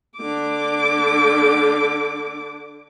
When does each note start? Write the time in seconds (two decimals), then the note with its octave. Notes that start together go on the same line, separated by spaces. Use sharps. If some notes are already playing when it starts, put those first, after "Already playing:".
0.17 D3 D6